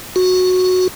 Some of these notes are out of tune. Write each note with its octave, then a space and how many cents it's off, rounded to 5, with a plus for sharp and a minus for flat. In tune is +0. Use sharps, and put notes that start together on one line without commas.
F#4 -10